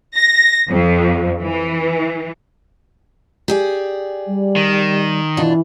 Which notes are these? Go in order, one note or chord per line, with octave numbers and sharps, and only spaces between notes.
A#6
F2
E3
G4 G#4 D5
G3
D#3
B2 E3 D4 F4